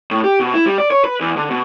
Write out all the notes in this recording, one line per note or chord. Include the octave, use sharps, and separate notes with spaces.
A2
G4
B2
E4
G3
D5
C#5
B4
E2
D3
B2